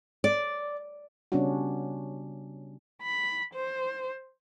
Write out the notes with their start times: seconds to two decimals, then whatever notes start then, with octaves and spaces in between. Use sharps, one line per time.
0.24 D5
1.32 C#3 G3 B3 C#4 D4 F#4
3.03 B5
3.54 C5